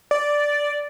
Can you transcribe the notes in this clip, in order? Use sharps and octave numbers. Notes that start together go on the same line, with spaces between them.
D5